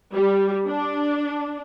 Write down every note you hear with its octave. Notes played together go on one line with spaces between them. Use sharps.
G3
D4